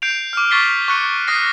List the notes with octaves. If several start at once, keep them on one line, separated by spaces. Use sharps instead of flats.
G6 C7 D7 F7
D6 F6
C#6 D6 A6 B6 C7 G7
C#6 F#6 C#7
D#6 F#6 A#6 C7